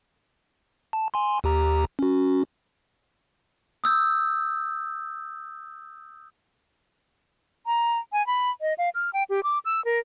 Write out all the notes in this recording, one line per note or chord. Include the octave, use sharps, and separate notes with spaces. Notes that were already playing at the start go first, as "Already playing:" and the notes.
A5
G#5 C6
D#2 G4 A#5
C#4 F#4
D#6 E6 G6
A#5
G#5
B5
D#5
F5
F6
G5
G4
D6
E6
A#4